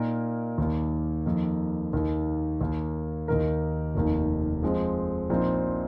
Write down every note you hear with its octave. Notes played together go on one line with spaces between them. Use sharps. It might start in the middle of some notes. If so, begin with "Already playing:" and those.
Already playing: A#2 A#3 D#4 A#4
D#2 D#3 A#3
F2 D#3 A#3
D#2 D#3 A#3
D#2 D#3 A#3
D#2 D#3 A#3 D#4 A#4
F1 D#2 D#3 A#3
F2 F3 G#3 C4
A#1 A#2 F3 C4 D#4